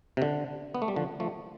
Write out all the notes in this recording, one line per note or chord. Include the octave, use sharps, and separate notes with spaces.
C3
D3
B3
A3
G3
D3 F3
F3 A3